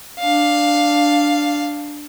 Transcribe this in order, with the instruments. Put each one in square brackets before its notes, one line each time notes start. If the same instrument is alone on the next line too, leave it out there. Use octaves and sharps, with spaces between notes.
[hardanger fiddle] D4 F5